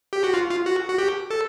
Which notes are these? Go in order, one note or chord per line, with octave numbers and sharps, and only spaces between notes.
G4
F#4
F4
F4
F#4
F#4
G4
A4